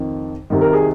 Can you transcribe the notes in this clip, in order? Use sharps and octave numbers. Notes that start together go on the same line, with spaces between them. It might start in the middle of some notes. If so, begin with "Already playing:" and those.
Already playing: F2 D#3
C2 C3 D#3
A#4
G#4